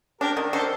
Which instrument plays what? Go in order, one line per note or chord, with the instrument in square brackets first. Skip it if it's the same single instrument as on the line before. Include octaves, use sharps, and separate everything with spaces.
[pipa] D4 [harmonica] G4 A#4
[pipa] D#3
[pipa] D#3 [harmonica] A4 C5